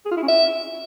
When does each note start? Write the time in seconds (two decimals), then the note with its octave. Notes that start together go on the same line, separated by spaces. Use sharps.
0.05 G#4
0.11 F4
0.17 E4
0.22 C#4
0.28 E5